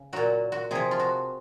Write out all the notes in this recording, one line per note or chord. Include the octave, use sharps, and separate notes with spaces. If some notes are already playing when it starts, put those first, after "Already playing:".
Already playing: C#3
A#2 F#3 F#4
F#4
C3 F3 G#4
F4
F#4